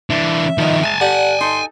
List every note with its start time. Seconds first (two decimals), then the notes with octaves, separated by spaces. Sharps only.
0.10 E3 D4 E5
0.58 B2 D#3 F3 D#5
0.84 G#3 G#5 A5
1.01 G4 A4 D5 F#5
1.40 D#4 A4 C6